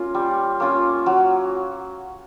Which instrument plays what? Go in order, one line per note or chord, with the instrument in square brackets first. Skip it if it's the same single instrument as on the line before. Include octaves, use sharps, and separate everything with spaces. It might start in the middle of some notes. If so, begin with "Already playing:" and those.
Already playing: [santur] A#3 C#4 F4
G3
A#3 C#4 F4
F#3